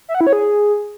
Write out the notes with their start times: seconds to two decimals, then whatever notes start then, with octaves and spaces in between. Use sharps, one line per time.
0.09 E5
0.15 F#5
0.21 E4
0.27 C#5
0.33 G#4